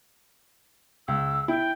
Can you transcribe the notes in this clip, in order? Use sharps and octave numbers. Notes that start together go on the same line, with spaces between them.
C#2 E6
E4 G5